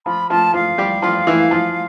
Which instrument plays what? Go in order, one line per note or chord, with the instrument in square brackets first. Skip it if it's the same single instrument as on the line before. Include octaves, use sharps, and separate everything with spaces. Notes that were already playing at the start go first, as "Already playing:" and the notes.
[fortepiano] F3 F4 [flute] B5
[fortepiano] F3 F4 [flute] A5
[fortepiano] F3 F4 [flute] F5
[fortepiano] G3 G4
F3 F4
E3 E4
F3 F4